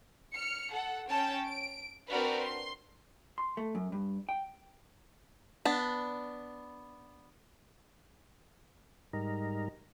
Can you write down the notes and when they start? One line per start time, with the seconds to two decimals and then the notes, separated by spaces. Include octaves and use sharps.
0.33 F6 C#7
0.72 A4 F#5
1.09 C#4 G5 A5
1.44 D7
2.07 C4 D4 F#4 A#4 B4 D5
2.43 C6
3.38 C6
3.57 A3
3.75 F#2
3.92 G2
4.29 G5
5.65 B3 D4
9.13 G#2 G3 D#4 A#4